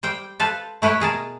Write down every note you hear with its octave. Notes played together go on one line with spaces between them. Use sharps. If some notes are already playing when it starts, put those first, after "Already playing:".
G3 C5 G5
A4 B4 C5 F5 A5
A3 E4 B4 C#5 G5
B2 G#4 A#4 A5